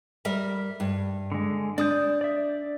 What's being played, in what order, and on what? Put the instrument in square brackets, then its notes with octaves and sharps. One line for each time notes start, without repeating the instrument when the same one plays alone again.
[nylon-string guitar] G3 A#4 E5
G2
[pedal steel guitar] D3 G#3
[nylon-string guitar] D4 [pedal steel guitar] D5 D#6 G6
[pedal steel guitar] D5 E5